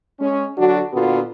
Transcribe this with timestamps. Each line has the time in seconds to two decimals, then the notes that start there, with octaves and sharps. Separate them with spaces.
0.20 G#3 C#4
0.58 D3 F#3 D4 F#4
0.93 A#2 D3 B3 F4 F#4